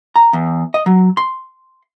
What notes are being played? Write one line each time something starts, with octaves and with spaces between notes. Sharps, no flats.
A#5
E2
D#5
F#3
C6